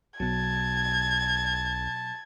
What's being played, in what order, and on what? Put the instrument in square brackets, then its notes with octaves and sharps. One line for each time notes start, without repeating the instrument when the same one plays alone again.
[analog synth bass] B1 [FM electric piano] B2 F#3 [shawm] A5 [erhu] G#6